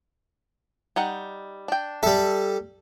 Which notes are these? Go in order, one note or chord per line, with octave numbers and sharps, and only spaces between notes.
G3 D#4 F#5
D4 G5
G3 A4 E5